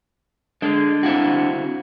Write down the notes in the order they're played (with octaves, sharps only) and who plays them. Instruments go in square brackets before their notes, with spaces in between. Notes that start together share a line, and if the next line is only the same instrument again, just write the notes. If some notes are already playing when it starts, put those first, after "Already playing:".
[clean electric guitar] D3 [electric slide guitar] G#3
[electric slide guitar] C4 E4 F#4